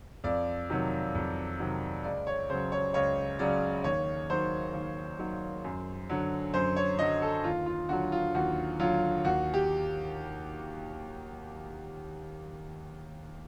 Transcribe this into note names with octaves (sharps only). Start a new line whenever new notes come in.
F2 D5
C3 D#3 F#3
F2
C3 D#3 F#3
C#2 D5
C#5
C#3 F#3 C5
C#5
C#2 C#5
C#3 F#3 D5
D#2 C#5
D#3 F#3 C5
D#2
D#3 F#3
F#2
D3 F#3
F#2 C5
C#5
D3 F#3 D#5
A4
D#2 F4
F4
D3 F#3 F#4
F4
D#2 F#4
D3 F#3 F4
D#2 F#4
G4